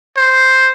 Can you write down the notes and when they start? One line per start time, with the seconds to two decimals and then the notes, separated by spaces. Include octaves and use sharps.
0.17 C5